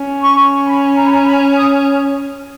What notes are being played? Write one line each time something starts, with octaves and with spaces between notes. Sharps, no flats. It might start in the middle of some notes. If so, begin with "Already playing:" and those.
Already playing: C#4
C#6
B5
A#5
B5
A#5
B5
D#6